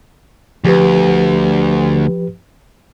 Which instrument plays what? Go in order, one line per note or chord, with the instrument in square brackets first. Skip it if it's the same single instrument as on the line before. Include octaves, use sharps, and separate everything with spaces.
[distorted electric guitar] D2 [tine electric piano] F3 G4 B4